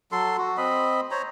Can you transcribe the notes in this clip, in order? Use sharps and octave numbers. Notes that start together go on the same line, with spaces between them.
F#3 A4 C6
F#4
C4 D#5 B5
C5 C#5 A#5